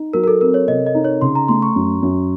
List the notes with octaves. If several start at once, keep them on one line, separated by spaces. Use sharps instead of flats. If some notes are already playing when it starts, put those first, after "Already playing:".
Already playing: D#4
F#3 A#4
A#4
A4
C4 A#4
C#5
C3 D#5
D#5
D#4
C#5
C#3 C6
A#5
A3 C6
C#6
F#2
F#2